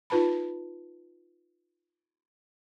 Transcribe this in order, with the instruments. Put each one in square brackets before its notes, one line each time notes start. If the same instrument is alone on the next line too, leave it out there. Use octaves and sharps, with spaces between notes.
[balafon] D#4 F4 B4 A5 B5